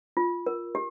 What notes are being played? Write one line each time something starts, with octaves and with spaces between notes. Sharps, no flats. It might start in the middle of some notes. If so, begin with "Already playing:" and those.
F4
A#4
G4